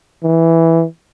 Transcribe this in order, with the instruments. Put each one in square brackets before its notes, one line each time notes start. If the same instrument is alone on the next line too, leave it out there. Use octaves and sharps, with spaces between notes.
[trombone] E3